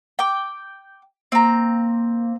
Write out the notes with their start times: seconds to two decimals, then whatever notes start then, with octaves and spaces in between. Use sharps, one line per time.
0.19 G5 D6
1.32 A#3 C4 A#5